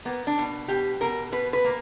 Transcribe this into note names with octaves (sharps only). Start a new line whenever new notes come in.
A#3 B3
D4
B2
B2 G4
B2 A#4
B2 B4
B4
A#3